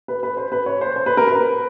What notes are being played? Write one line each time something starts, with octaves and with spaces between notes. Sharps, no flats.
B4
B4
C5
B4
C#5
C5
C5
B4
A#4
B4